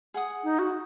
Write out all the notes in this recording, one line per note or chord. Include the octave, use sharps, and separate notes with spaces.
G#4 F#5 D#6
D#4
F#4